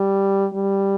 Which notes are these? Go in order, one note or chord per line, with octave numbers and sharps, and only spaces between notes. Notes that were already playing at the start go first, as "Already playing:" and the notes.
Already playing: G3
G3